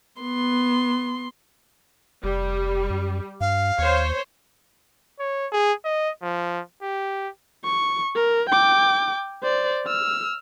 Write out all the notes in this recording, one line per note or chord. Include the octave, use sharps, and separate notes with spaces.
B3 C6
F1 G3
F#2
G2 F5
D#2 C5 C#5
C#5
G#4
D#5
F3
G4
C#6
A#4
G5 D6
C5 D5
E6 F6